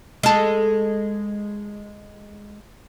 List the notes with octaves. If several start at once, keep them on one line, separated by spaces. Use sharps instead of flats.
G#3 A4